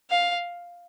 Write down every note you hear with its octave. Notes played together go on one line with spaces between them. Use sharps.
F5